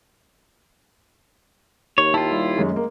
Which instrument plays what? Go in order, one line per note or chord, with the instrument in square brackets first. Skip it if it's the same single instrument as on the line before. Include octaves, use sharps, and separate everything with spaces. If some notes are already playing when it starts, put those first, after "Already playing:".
[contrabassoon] D#2 [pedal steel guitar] C#5
[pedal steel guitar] E4 F4 [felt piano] G5 A5
[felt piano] G3
F#2 G#3 C#4
G#3 A#3